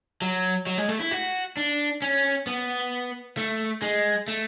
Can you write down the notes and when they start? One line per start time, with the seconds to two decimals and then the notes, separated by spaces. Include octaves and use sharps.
0.22 F#3
0.67 F#3
0.78 G#3
0.89 A3
1.00 E4
1.11 F#4
1.57 D4
2.02 C#4
2.47 B3
3.37 A3
3.82 G#3
4.28 A3